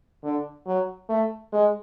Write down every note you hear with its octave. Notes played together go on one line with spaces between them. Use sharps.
D3
F#3
A3
G#3